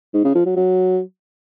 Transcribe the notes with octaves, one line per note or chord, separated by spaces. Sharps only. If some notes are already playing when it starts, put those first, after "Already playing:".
G#2
C#3
F3
F#3
F#3